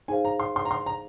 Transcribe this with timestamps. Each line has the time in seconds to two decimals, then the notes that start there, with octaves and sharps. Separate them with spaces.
0.08 D#4 G#4 C5 F5 G#5
0.25 A#5
0.40 C6
0.56 C6
0.65 A#5
0.71 C6
0.86 A#5